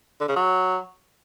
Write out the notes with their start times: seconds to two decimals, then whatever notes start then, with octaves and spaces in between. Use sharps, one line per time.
0.21 D3
0.28 C#3
0.36 F#3